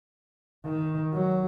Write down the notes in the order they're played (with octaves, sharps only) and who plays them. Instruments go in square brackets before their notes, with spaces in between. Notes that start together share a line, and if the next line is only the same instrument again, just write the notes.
[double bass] D#3
F#3